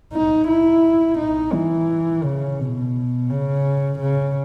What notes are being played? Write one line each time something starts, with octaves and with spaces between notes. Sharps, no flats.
D#4
E4
D#4
E3
C#3
B2
C#3
C#3